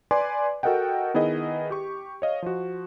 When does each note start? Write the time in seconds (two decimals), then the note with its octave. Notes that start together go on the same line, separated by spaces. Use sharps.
0.11 B4 D5 G#5 C6 D6
0.63 F#4 A4 A#4 D#5 F#5 G5
1.14 D#3 B3 E4 G#4 D#5
1.70 G4 C#6
2.22 C#5 D#5 F5
2.42 F3 F#4